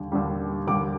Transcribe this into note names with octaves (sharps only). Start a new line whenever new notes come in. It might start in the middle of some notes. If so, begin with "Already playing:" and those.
Already playing: D#2 D3 G3
D#2 D3 G3
D#2 D3 G3 D6